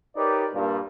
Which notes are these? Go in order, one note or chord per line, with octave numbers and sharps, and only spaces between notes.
D#4 G4 A#4 B4 C#5 D5
G2 A#2